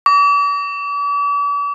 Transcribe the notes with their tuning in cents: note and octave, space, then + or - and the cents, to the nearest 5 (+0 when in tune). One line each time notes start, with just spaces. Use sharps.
D6 -45